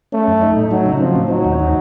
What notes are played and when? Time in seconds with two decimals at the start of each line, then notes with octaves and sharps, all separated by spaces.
0.12 A3 C#4
0.27 F#2
0.42 D#4
0.56 A2
0.71 F#3 D#4
0.86 C#3
1.01 F3 C4
1.15 A2
1.30 F#3 D#4
1.45 D#2
1.60 D#4